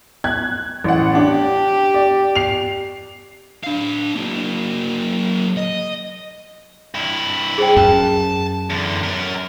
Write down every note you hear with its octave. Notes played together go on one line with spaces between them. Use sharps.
F#6 G#6
A1 F#5
D4 G4
D5
C7 F7
D4 F5
F#3 A#3
D#5
G2 E4
G#4 C5 G5
F#2 C#4 F5 G5 A5
E2 D3
F#2 A#4